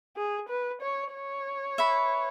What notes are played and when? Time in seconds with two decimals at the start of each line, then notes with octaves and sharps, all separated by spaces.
0.17 G#4
0.49 B4
0.81 C#5
1.14 C#5
1.78 B4 E5 B5